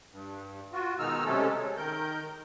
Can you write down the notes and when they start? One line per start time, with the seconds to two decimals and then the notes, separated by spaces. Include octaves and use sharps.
0.12 G2
0.73 F4 F#4
0.99 B2 D#3 G#3 D#4 E6 F6
1.25 C3 F#3 G#3 A3 C#4 A4
1.61 G#3
1.77 D#3 A#4 G6